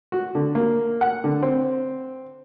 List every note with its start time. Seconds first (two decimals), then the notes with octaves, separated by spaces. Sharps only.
0.12 F#4
0.35 D3
0.55 A#3
1.01 F#5
1.24 D3
1.43 C4